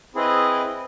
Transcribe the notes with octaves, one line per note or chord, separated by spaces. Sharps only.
C4 E4 G#4 B4 D#5